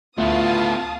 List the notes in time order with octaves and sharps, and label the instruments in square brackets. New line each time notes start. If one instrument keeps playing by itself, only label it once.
[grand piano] D2 [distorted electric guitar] A2 B3 [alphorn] F4 [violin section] F5 A5 D#6